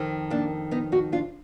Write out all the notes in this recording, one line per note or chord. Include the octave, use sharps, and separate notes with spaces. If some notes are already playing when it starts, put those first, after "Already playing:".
Already playing: F2 D#3
A#3 D4
B3 D#4
D#4 F#4
D4 F4